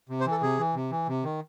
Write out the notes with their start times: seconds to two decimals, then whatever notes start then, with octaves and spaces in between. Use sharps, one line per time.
0.09 C3
0.20 C5
0.26 E3
0.31 A4
0.42 C3 G#4
0.59 E3
0.74 C3
0.91 E3
1.08 C3
1.24 D#3